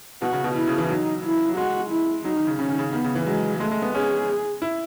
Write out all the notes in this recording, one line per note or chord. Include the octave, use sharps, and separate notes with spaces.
B2 F#4
C#3
B2
E4
C#3
E3
F#3 D#4
E4
F#3
G#3 F#4
E4
F#3 D#4
D#3
C#3
C#3 C#4
D#3
C#3
D#3 B3
C#3
E3
F#3 G#3
G#3 A3
G#3
B3
C#4 G#4
E4